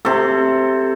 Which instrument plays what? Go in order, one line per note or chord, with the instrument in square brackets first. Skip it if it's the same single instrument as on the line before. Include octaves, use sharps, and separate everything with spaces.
[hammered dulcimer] C3 A4